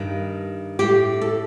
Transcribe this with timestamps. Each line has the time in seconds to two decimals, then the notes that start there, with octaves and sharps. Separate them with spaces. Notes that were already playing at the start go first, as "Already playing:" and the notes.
Already playing: G2 D#3
0.79 A2 G4
1.21 A4